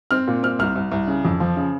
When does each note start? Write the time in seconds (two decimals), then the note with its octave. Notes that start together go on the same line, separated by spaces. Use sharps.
0.11 C4 F6
0.28 A#2
0.43 C4 F6
0.59 C2 F6
0.76 C2
0.92 C2
1.07 C#3
1.25 F2
1.40 F3
1.57 C#3